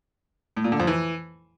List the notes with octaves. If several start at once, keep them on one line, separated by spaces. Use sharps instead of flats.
A2
A#2
D3
F2
E3